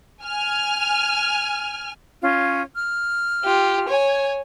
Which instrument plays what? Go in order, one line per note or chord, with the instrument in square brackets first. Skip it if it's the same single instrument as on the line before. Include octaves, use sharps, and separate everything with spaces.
[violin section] G#5 F6
[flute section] C#4 F4 C#5
F6
[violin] F4 G4
C#5 G#5